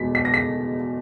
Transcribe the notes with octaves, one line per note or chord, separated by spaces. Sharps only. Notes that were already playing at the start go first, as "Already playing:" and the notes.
Already playing: E2 B2 G#3 B6
B6
A#6
B6